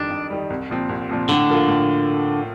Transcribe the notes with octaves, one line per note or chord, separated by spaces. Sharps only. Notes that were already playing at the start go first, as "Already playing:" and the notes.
Already playing: F2 D#3 G3 D4
F2
D#3 G3
C2
A#2 F3 C4
C2
A#2 F3 C4
A2 D3
F3 A#3 F4
A2